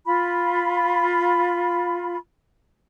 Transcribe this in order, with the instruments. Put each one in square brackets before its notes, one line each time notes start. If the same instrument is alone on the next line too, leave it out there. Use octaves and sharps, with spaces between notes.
[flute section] F4 B5